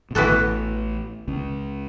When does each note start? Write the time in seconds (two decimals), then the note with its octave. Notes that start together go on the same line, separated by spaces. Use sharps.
0.11 B2
0.15 A1 A2 E3 B3 F#4 A4
1.28 C#2 C#3